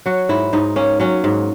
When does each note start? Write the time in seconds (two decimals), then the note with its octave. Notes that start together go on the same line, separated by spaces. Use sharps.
0.06 F#3 F#4
0.29 G#2 E4
0.53 G#2 D#4
0.76 A#3 C#4
1.00 F#3 C#4
1.24 G#2